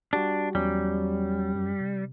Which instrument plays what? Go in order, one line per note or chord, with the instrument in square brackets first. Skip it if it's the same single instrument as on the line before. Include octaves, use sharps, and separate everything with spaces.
[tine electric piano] G3 F#4 G4 [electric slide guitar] D4
[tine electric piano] E2 F#3 C#4 [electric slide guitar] G3
[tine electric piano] F#2
C3